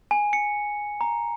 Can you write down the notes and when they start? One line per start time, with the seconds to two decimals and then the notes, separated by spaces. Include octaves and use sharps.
0.11 G#5
0.33 C#7
1.01 A#5